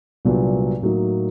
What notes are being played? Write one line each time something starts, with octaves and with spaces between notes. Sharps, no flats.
C2 A#2 F#3 B3 D4
A2 F#3 A#3 D#4 F#4